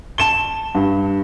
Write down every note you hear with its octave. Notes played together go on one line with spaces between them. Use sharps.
A5 E7 G7
G2